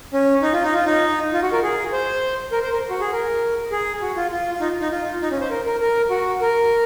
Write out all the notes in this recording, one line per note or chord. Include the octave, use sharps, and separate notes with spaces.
C#4
D#4
F4
D#4
F4
D#4
F4
F#4
A#4
G#4
C5
A#4
C5
A#4
F#4
G#4
A#4
G#4
F#4
F4
F4
F4
D#4
D#4
F4
D#4
C#4
C5
A#4
A#4
A#4
F#4
A#4